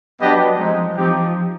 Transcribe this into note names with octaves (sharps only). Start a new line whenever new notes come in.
F#3 B3 D4 G4 B4 D#5
F3 G#3 C4 D#4
F3 C4 D#4 G4